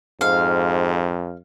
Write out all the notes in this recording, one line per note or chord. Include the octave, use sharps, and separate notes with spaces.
F2 G#2 F5